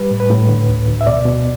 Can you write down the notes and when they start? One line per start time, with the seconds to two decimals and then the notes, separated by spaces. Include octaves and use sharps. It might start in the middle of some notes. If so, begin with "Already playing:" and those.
Already playing: G3 B4
0.11 A2
0.20 B4
0.30 A2
0.49 D3
0.69 D2
0.88 D2
1.01 E5
1.07 B2 D5
1.26 B2